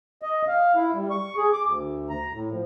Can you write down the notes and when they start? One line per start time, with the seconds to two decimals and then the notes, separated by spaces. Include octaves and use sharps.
0.22 D#5
0.48 F5
0.76 E4
0.94 G3
1.10 C#6
1.37 G#4
1.53 D6
1.67 D2
2.09 A#5
2.33 A2
2.52 F3